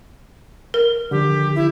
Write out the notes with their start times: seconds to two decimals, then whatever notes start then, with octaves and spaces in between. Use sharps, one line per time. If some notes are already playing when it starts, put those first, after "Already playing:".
0.74 A#4
1.11 D3 D#3 F3 G4
1.55 E4